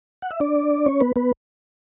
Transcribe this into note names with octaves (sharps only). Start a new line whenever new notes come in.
F#5
E5
D4 D5
C#4 C#5
B3 B4
B3 B4